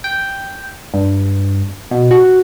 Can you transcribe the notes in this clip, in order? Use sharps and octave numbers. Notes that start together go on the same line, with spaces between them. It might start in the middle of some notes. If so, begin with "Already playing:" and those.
G5
G2
B2
F#4